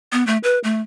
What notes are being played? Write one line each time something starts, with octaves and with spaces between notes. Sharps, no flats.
B3
A3
B4
A3